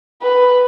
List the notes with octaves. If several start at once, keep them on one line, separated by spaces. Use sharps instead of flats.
B4